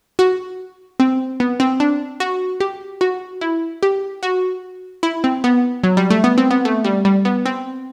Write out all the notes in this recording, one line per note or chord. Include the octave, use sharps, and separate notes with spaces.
F#4
C4
B3
C4
D4
F#4
G4
F#4
E4
G4
F#4
E4
C4
B3
F#3
G3
A3
B3
C4
B3
A3
G3
G3
B3
C4